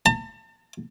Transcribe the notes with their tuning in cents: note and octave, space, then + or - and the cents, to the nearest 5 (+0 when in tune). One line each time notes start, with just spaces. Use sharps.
A5 +40